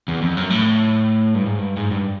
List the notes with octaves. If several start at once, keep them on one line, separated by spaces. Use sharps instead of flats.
E2
F2
F#2
A2
G2
G#2
G2
G#2
G2